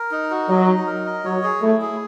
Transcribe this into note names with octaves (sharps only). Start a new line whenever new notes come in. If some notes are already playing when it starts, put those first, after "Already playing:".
Already playing: A#4
D#4
F#4
F#3 D#5
D#4
A#4
D#5
F#3 C#5
G#4
A3 E4
G#4